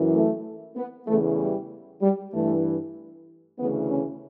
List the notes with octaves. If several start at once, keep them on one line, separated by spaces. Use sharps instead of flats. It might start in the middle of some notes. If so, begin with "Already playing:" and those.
Already playing: F#2 E3
A3
B3
E2 C#3 E3 A3
G3
G3
G2 E3 A3
D2 C#3 E3 B3
C#4